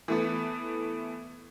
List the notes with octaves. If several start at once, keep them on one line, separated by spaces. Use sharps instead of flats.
E3 A3 B3